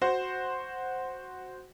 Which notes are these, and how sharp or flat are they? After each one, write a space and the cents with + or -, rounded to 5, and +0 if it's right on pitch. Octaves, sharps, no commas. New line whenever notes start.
F#4 +0 C5 +0